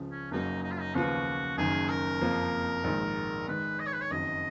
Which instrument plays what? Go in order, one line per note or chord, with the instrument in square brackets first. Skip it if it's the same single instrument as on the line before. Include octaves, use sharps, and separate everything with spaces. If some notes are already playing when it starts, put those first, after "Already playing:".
Already playing: [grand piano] C#2 C#3 F3
[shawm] C#4
[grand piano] F#1 F#2 C#3 F#3 A#3 [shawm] D#4
[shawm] D#4
F4
D#4
[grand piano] D#2 C#3 F3 B3 F4 [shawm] F#4
[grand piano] F#1 F#2 D#3 [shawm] G#4
[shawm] A#4
[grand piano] F#1 F2 F3 A#3
A#1 G#2 D#3 G#3 D#4
[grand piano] D#3 G#3 B3 [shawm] B4
[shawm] D#5
C#5
B4
C#5
[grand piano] F#1 F2 D#3 F#3 [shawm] D#5